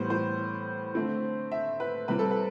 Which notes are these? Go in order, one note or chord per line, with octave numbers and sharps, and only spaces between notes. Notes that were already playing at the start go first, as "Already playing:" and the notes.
Already playing: A2 E3 G3 B3 C5
C5
D3 A3 C4
E5
B4
C3 G3 C4 B4
A4
B4